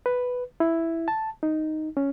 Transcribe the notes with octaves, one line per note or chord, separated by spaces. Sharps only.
B4
E4
A5
D#4
C#4